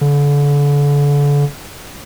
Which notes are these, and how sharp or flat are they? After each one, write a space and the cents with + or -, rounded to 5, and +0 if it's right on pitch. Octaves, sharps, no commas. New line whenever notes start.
D3 -35